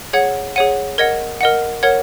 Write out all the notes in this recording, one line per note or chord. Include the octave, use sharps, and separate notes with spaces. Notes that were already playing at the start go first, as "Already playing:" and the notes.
G#4 C#5 F#5 G#6
G#4 C#5 F#5 D#7
A#4 D#5 F#5 G#6
A#4 D#5 F#5
A#4 C#5 F#5 G#6